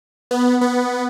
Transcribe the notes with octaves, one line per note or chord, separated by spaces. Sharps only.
B3
B3